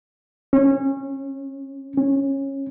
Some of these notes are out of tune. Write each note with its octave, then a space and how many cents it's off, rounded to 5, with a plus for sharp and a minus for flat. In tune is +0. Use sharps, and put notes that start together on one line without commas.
C#4 -25
C#4 -20